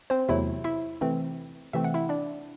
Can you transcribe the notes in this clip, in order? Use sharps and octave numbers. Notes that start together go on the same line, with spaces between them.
C4 C5
E2 C3 F#3 A3 E4 E5
E4 E5
C3 E3 A3 C4
C3 E3 A3 C4 E5
F#5
E4 E5
D4 D5